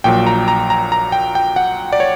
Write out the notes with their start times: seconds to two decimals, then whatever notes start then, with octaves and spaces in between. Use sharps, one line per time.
0.04 A#1 A#2 F#3 G5
0.27 A#5
0.48 A#5
0.70 A#5
0.92 A#5
1.12 G5
1.35 G5
1.56 F#5
1.93 D5
2.00 C#5